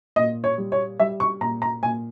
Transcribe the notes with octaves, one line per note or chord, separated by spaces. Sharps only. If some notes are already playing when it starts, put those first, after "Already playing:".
A#2 D#5
C#5
G3
C#5
G3 E5
C#6
A#2 A#5
A#5
A#2 G#5